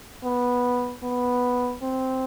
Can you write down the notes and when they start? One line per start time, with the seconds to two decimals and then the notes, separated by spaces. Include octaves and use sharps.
0.24 B3
1.03 B3
1.83 C4